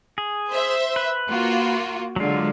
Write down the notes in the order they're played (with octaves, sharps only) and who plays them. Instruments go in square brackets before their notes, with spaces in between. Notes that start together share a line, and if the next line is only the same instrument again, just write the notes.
[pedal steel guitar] G#4
[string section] C5 E5
[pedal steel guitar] B4
[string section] A#3 F4 F#4
[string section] D3 G#3 [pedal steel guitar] F#3 F4